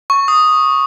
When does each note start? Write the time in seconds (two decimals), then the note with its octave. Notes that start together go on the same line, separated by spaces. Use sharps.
0.10 C#6
0.28 D#6